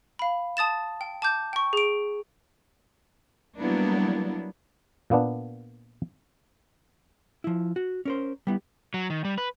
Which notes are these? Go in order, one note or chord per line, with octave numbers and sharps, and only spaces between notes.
F5 B5
A5 D#6 A6 E7
G5
A5 D6 G6
G5 C#6
G#4 D7
F#3 G3 A#3 B3 D4 E4
A#2 A#3 B3 D4
F3 E4
F#4
C#4 A#4 C5
G3 B3 E4
F#3
D#3
G3
B4